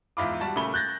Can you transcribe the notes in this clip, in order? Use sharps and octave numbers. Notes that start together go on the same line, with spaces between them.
E2 G#2 E4 F4 B5 D6
G3 F#4 A5
A#2 C#3 A3 B5 G7
F#6 G6 A6 A#6